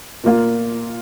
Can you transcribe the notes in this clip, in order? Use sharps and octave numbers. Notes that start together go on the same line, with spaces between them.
A#2 A#3 F4